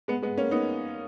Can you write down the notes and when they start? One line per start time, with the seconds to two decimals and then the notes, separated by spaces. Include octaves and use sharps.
0.08 G#3 B3
0.22 G#3 B3
0.37 A#3 C#4
0.51 B3 D#4